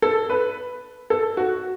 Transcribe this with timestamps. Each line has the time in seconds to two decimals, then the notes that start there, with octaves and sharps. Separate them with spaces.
0.02 A4
0.30 B4
1.10 A4
1.37 F#4